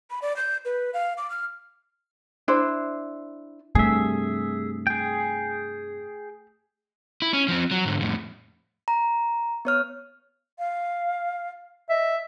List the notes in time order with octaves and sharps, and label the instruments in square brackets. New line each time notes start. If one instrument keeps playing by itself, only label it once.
[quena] B5
D5
G6
B4
F5
D6
F6
[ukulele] D4 E4 C5
[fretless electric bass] G2 C3 [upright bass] A3 [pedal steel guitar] G#4 E5
[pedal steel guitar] G#4 G5
[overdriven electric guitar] E4
C#4
F3 C4
F#3
G#2 D3
F2 A2
[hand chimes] A#5
B3 C#5 F6
[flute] F5
[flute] D#5 [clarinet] E5